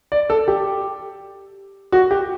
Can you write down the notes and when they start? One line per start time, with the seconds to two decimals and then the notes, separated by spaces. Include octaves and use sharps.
0.12 D5
0.30 A4
0.48 G4
1.92 F#4
2.11 G4